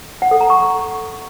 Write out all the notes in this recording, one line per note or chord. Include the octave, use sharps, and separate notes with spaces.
F#5
A4
A#5
C#6